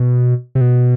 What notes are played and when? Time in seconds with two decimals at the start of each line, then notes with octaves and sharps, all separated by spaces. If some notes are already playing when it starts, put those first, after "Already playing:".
Already playing: B2
0.55 C3
0.61 B2